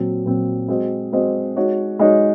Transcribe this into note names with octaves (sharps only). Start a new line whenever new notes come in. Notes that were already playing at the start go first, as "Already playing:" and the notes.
Already playing: A#2 F#3 C4
A#2 F#3 C4
G#3 C4 F#4 C5 D#5
G#3 C4 F#4 C5 D#5
G#3 D#4 F#4 C#5
G#3 D#4 F#4 C#5